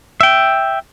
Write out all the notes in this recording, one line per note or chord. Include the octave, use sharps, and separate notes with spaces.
E5 G5